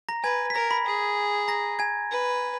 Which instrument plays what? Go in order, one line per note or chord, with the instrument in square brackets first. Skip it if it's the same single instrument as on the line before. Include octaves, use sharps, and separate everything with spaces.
[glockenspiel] A#5 A#6
[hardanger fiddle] B4 [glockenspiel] G#5 G#6
[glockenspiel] B6
[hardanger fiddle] A#4 [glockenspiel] A#5 A#6
[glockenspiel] B5 B6
[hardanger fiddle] G#4
[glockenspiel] A#5 A#6
G#5 G#6
[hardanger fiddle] B4